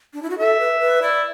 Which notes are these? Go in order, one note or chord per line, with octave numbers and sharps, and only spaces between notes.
D4
E4
F#4
A4 E5
B4
B4
E4 D5